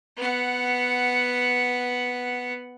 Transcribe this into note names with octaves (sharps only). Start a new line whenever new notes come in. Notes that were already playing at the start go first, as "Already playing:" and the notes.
B3 F#5